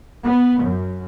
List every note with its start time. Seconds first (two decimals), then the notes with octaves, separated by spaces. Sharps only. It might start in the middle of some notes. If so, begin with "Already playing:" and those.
0.24 B3
0.61 F#2